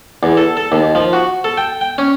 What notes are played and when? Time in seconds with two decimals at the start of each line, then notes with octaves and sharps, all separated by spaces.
0.23 E2
0.37 A4
0.57 A4
0.72 D#2
0.95 F3
1.13 F#4
1.44 A4
1.58 G5
1.81 G5
1.98 C#4